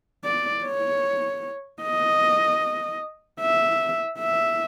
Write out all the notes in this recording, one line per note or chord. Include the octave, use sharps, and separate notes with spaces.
D5
C#5
D#5
E5
E5